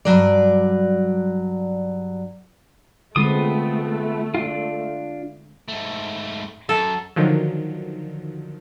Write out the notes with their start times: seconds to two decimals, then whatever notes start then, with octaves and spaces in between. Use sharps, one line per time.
0.05 G2 B2 F#3 D5
3.16 D3 G#3 A3 B3 C4 F4 D#6
4.35 D4 F4
5.68 G#2 A3
6.69 F#2 A4
7.16 D3 D#3 F3 F#3